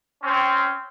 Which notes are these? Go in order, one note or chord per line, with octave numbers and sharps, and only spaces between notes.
C4 C#4